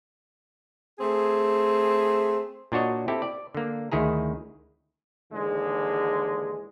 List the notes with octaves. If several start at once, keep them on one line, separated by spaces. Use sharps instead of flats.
A3 C4 G#4
A#2 D4 F#4 C#5 D#5
C4 E4 G4 A4
D5
D3 A#3
D2 D#3 E4 G#4 A#5
D#2 G#2 D3 E3 G#3